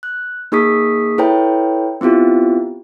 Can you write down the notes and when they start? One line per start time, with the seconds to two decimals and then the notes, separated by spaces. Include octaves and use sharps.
0.03 F#6
0.52 A#3 D#4 G#4 C#6 D#6 B6
1.18 E4 A4 B4 C#5 G5 A#5
2.01 B3 C4 E4 F4 G4